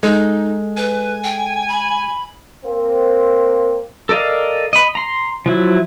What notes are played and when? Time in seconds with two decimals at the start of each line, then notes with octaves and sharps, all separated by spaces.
0.03 G#3 D#4 A4
0.77 B4 G#5
1.24 G5
1.68 B5
2.65 A#3 C4
4.09 A4 A#4 D5 D#5 F5
4.73 D#5 B5
4.95 A#5 C6
5.46 F3 F#3 E4